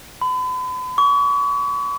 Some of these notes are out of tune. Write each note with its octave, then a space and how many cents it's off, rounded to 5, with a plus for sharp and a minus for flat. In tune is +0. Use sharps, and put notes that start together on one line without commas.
B5 +40
C#6 +40